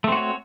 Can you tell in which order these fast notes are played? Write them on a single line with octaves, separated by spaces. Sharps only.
A3 C4 F#4 C#5